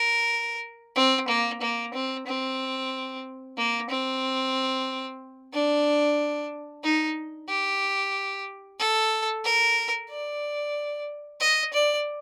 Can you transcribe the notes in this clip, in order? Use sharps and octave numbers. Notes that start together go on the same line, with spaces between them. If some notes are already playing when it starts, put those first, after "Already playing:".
Already playing: A#4
C4
A#3
A#3
C4
C4
A#3
C4
D4
D#4
G4
A4
A#4
D5
D#5
D5